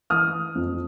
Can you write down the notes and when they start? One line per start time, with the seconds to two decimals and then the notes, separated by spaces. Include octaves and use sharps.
0.10 E3 D#6 F6
0.55 F2